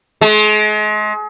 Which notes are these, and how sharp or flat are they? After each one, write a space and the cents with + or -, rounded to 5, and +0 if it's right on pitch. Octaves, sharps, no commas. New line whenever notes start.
G#3 +35